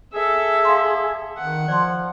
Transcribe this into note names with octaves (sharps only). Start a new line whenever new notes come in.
G#4 A4 E5
F5 C6
D#3 F#5
F3 D5 C6